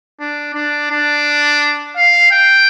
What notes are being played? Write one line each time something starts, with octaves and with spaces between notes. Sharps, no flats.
D4
D4
D4
F5
G5